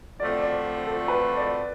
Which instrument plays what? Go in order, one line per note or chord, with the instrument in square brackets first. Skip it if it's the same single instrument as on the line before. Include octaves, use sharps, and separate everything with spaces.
[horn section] D3 F3 A3 C4 [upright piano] D5
[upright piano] D5
A4
B4
D5